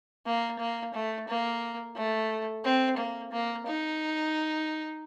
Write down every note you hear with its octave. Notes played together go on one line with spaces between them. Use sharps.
A#3
A#3
A3
A#3
A3
C4
A#3
A#3
D#4